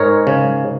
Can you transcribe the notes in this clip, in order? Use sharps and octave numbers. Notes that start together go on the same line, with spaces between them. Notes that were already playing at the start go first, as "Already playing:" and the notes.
Already playing: G#2 G#3 A#4 C#5
C#3